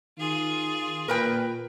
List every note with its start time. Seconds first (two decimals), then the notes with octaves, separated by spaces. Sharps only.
0.18 D#3 F4 G#4
1.08 A#2 A#4 B4 G5